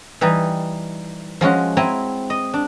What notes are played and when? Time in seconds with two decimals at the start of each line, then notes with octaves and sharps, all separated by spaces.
0.21 E3 G3 D#4
1.41 F3 G#3 C#4 F#4
1.77 C4 E4 E5 G#5 A#5
2.30 D#5
2.54 D4